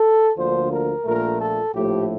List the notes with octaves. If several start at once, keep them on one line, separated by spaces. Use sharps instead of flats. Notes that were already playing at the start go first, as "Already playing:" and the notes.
Already playing: A4
D2 D3 F3 A#3 C5
A#4
A#1 A#2 A3 A#4
A4
A#1 A2 F3 A3 G4